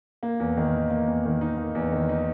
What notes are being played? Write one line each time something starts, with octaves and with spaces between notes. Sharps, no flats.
A#3
E2
D#3
D#4
A#3
E2
D#3
D#4
A#3
E2
D#3
D#4